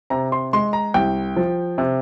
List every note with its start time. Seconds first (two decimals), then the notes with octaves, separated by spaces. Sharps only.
0.10 C3 A#5
0.32 C6
0.53 G#3 C6
0.73 A#5
0.94 C2 G5
1.36 F3
1.78 C3